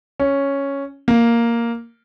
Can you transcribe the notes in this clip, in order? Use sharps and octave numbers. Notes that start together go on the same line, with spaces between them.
C#4
A#3